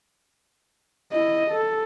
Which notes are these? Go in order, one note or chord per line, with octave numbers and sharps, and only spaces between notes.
E4 D#5
A4